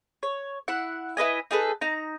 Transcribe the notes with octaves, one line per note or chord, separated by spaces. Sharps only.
C#5
E4 F#5
E4 B4 D#5 G#5
D#4 G#4 A4 B4
D#4 A#5